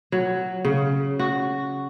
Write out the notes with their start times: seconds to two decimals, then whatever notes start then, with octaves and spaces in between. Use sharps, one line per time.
0.12 F#3
0.65 C#3
1.19 F#4